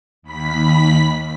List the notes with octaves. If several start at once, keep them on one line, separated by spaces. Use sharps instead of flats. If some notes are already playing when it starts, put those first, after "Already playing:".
D#2 B5 B6